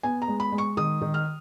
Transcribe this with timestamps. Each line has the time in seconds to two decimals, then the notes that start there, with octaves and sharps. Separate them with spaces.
0.03 B3 G#5
0.22 A#5
0.28 G#3
0.40 B5
0.52 G#3
0.58 C#6
0.77 D#3 D#6
1.01 D#3
1.14 F6